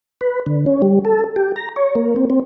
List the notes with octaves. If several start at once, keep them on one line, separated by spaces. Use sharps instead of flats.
B4
D3
C#4
G3
A4
G4
A#5
C#5
A#3
C4
C4